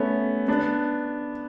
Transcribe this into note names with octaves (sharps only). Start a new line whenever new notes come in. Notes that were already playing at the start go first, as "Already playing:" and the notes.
Already playing: A3 B3 C#4
B3 D4